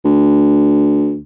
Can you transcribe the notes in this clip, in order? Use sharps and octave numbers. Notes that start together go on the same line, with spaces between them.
D2